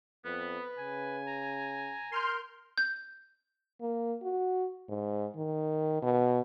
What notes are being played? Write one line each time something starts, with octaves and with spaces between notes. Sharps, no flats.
F2 B3 B4
C#3 G#5
A#5
A#4 C6 F6 G6
G6
A#3
F#4
G#2
D#3
B2